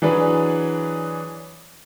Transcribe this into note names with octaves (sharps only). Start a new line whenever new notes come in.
E3 F#3 D4 G#4 B4